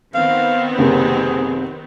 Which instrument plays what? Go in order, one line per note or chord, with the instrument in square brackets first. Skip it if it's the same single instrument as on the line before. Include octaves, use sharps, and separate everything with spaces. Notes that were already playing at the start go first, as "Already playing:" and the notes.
[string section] D#3 B3 C4 [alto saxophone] F5
[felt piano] F#1 C3 [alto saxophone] G#4